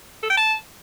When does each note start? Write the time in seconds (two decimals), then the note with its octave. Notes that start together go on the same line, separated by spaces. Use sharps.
0.23 A4
0.30 G5
0.37 A5